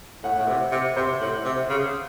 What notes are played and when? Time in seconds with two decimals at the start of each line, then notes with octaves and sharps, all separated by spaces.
0.23 A2 F#5
0.37 A2
0.48 C3
0.72 C3
0.97 C3 C5
1.21 A2
1.45 C3
1.69 C#3